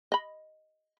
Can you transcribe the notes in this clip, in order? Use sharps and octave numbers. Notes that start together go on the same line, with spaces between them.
D#5 B5